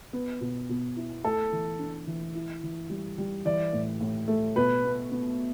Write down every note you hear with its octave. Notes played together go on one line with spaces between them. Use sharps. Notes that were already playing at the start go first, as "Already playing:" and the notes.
B3
B2
B2
E4
A3 A4
E3
D4
E3
E4
E3
G3
G3
E3 D5
A2
A2
A3
B2 B4
B3
B3